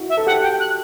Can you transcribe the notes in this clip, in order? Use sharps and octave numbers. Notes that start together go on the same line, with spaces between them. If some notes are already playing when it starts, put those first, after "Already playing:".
Already playing: E4 F#4
E5
A4
G4 F#5
G5
F#6